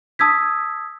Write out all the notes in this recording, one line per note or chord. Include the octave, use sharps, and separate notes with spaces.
A5 D#6 E6 G#6 B6